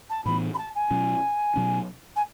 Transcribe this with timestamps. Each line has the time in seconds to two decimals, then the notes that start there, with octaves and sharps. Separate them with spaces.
0.09 A5
0.25 A2 E3 B3 B5
0.54 B5
0.58 A5
0.75 G#5
0.91 B2 F#3 C#4
1.56 B2 F#3 C#4
2.15 G#5